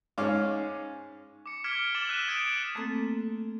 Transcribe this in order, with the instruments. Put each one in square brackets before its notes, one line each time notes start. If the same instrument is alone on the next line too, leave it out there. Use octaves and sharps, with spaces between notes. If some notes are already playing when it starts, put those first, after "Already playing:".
[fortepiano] G#2 C#4 F5 D6
[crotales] D6 C#7
D6 F6 G#6 B6 C#7 D7
D6 A6 E7 F#7 G7
E6 F#6 B6 D#7 E7
D#6 G#6 A6 D7
[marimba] A3 A#3 C4 A4